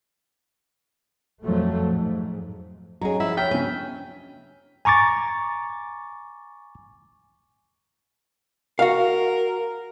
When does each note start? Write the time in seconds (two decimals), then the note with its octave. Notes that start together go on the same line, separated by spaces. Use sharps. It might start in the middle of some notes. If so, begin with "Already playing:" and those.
1.42 F2 A#2 F3 F#3 A3
1.90 G#2
3.01 F#3 C#4 G#4 D#5 A#5
3.20 F3 E4 F#5
3.37 C#5 G5 F6 B6
3.51 C#3 F#3 C#4 G#5
4.85 G#5 A#5 C#6 D6 A6
8.79 F#4 A#4 F5